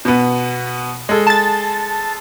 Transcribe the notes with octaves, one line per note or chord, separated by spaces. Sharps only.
B2 B3
G#3 A4
A5 A6